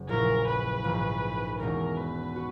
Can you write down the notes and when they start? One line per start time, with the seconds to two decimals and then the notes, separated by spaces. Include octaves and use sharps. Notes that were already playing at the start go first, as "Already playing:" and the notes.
Already playing: F#1
0.09 A#1 A#2 F#3 C#4 E4 A#4
0.47 B4
0.84 A#1 G#2 D#3 A#3
1.60 E1 E2 B2 G#3 C#4 A#4
1.98 B4
2.36 F#4